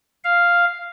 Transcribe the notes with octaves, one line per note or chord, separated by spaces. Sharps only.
F5